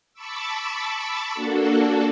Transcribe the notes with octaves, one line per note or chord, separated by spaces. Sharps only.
A5 B5 C#6 D6 E6
A#3 D4 F#4 A4